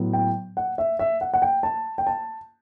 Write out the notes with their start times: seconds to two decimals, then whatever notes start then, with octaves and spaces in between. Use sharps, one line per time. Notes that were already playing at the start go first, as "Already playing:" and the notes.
Already playing: A2 F#3 B3
0.13 G5
0.57 F#5
0.78 E5
0.99 E5
1.21 F#5
1.34 F#5
1.42 G5
1.63 A5
1.98 G5
2.07 A5